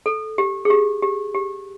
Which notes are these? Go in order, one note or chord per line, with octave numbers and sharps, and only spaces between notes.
A4
G4
G#4
G4
G4
G4